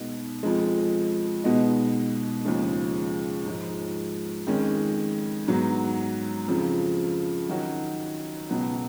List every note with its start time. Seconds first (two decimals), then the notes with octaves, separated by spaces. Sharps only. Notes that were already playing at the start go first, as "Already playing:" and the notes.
Already playing: B2 G#3 B3 D#4
0.43 F2 F3 G#3
1.44 B2 G#3 B3 D#4
2.45 D#2 C#3 F3 G#3
3.45 G#2 F3 G#3
4.47 F2 D#3 G#3 C#4
5.48 G#2 F#3 B3 F#4
6.48 F2 C#3 F3
7.49 D#3 F#3 C#4 F#4
8.50 C#2 B2 F#3 B3